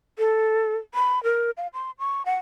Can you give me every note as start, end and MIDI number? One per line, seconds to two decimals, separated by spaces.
0.19 0.76 69
0.94 1.22 83
1.24 1.51 70
1.57 1.67 77
1.74 1.91 84
1.99 2.25 85
2.26 2.36 78